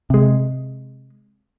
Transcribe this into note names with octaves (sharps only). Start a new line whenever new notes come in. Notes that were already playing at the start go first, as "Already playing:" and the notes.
C3 G#3